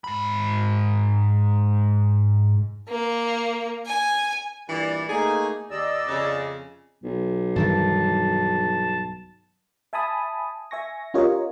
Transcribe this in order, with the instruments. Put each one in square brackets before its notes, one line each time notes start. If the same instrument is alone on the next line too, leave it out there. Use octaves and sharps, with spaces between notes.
[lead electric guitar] G#2 B5
[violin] A#3
G#5
[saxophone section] G2 A#2 E3 [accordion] D5
[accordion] A3 A#3 D#4 [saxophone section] G#4
[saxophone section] D#2 [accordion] D5 D#5 E6
[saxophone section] F2 C#3
[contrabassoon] B1
[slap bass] G2 D#3 E3 [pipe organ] A5
[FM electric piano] E5 G#5 A5 B5 D#6
E5 G#5 C#6 A#6
C#4 F4 G4 A#4 C#5 D#5